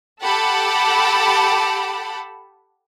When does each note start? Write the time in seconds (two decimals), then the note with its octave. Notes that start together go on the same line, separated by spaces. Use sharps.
0.22 G4 A4 F#5 A5 B5